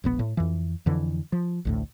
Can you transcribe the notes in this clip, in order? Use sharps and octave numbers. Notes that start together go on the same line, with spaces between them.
E1 A#1 B3
A2
F2 E3
F2 D3 E3
F3
A1 D2 A2